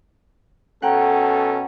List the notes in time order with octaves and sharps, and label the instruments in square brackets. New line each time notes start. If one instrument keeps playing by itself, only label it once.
[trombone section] B2 C#4 A4 [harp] F#5 G5 A#5